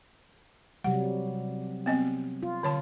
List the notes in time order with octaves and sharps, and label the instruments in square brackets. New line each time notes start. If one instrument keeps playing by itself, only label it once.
[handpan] C3 F#3 G3 [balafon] F#5
[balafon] B3 C4 D#5
[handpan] F4
[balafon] D3 C#5 A5